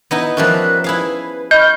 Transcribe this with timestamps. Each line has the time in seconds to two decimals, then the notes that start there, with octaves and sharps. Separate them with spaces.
0.11 B3 D#4 E4
0.37 F3 G3 C#4 A#4 E5 F#6
0.84 E4 G#4 B4 F5
1.51 D#5 B5 C#6 F6 G6